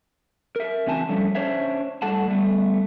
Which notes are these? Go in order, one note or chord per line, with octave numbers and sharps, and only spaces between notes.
A#4 E5
C#3 E3 C4 F#4 G#5 A5
D3 F3 G3 A3 C4 C#4
C#4 D4 C5 C#5 E5
A2 G3 A4 F#5 A5
G3 A3 B3